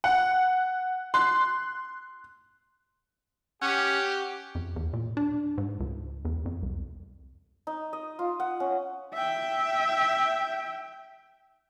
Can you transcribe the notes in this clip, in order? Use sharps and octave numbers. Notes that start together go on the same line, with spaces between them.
F#5
C6 F#6
C#4 G4 F#5
F2
E2
A#2
D4
G#2
C#2
E2
F2
C2
D#4
D#5
F4
F#5
C#4
E5 G5